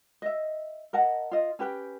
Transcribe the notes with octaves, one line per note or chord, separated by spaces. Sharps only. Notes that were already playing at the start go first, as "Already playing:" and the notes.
D#5 E5
A#4 D#5 F#5 A5
F4 D#5
C#4 G4 B4 G5